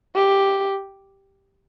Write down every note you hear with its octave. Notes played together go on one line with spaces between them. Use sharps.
G4